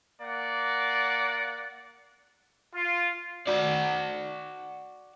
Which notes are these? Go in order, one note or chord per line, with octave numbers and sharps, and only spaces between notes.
A#3 D5 F#5
F4
F#4 D5